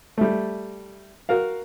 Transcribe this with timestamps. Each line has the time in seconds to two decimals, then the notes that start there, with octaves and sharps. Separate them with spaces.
0.18 G3 A3
1.29 F#4 A#4 F5